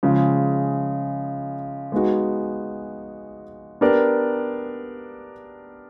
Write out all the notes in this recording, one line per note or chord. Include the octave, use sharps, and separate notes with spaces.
C#3 F3 G#3
G#3 B3 D#4 F#4
B3 D4 G4 A#4 D5